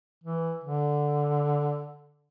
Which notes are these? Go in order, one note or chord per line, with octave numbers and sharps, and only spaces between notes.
E3
D3